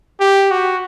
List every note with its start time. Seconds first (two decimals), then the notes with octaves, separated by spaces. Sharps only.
0.20 G4
0.51 F#4